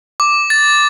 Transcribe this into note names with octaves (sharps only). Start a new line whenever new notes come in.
D6
A6